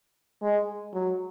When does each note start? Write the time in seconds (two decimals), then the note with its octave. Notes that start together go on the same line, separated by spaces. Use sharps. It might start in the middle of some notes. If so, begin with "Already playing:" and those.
0.42 G#3
0.94 F#3